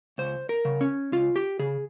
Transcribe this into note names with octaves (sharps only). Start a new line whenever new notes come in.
C#2 C5
A#4
C#3
C#4
C#2 F4
G4
C#3 G#4